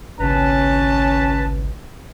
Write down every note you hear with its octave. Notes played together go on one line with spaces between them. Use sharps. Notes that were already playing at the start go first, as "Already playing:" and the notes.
G#1 C#2 C#3 C#4 B4 A5